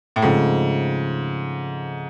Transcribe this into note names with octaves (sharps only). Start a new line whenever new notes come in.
A2
G#2 C#3 F3 A3 C4